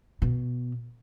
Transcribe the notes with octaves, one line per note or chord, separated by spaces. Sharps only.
B2